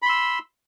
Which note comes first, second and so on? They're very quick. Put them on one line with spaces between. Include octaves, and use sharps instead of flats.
B5 C6 E6